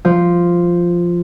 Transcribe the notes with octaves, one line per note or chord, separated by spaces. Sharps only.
F3